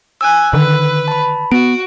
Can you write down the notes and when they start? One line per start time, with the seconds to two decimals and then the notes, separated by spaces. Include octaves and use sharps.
0.21 G#5 E6 F#6
0.53 D3 D#3 B4
1.08 A5 B5
1.52 B3 F#4 D7